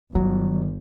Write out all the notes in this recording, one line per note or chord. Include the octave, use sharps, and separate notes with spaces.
G1 D#3 F#3